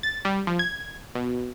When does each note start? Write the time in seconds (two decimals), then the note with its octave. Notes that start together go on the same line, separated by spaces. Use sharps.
0.03 A6
0.25 G3
0.47 F3
0.59 G#6
1.15 B2